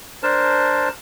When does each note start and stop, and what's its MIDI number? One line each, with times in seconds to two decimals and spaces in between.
0.23 0.89 62
0.23 0.89 70
0.23 0.89 72
0.23 0.89 81